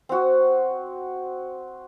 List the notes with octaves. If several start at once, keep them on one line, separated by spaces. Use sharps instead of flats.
C4 F#4